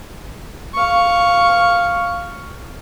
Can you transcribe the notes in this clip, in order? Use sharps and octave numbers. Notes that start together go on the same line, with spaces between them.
F5 C#6